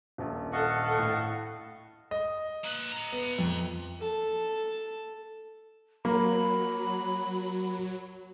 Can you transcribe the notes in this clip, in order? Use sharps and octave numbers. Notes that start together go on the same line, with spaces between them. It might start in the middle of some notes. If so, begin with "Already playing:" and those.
D#1 A#1
A4 D#5 F5 F#5 C#6
A2
D#5
A#3 B4
E5 A#5
B3
F2
A4 A5
F#3 A#3 B5